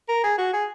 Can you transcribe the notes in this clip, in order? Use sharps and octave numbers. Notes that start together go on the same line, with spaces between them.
A#4
G#4
F#4
G#4